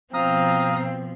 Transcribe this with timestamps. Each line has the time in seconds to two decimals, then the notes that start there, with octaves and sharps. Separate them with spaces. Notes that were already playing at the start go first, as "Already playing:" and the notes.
0.14 B2 F3 C4 F4 F5 A#5 D#6 F6